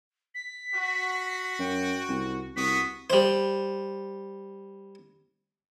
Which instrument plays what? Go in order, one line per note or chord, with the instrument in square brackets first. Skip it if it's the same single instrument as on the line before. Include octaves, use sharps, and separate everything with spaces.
[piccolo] B6
[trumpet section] F#4
[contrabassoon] F#2 [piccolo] G5
[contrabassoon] C2
[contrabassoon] C2 [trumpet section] B3 F#4 D#6 [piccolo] B6
[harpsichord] G3 C5